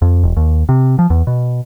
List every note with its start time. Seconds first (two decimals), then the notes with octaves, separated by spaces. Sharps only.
0.02 F2
0.24 E1
0.37 D#2
0.69 C3
0.99 F3
1.10 E2
1.27 B2